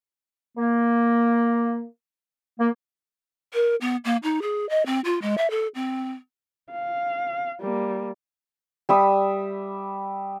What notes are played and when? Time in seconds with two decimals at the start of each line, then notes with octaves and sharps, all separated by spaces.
0.57 A#3
2.58 A#3
3.54 A#4
3.81 B3
4.05 A#3
4.23 D#4
4.42 G#4
4.69 D#5
4.86 C4
5.05 F4
5.22 G#3
5.38 E5
5.51 A4
5.75 C4
6.71 F5
7.61 G3 A#3
8.89 G3 E5 D#6